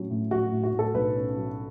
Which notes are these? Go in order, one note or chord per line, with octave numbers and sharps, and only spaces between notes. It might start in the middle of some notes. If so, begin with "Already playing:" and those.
Already playing: A2 F#3 C#4
A2
F#3 F#4
A2
F#4
A2
A4
B1 B4
C#4
F#3